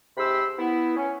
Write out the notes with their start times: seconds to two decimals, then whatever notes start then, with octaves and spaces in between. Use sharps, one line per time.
0.17 G#2 C3 G4 B5 C6 E6
0.59 B3 E4
0.96 C#4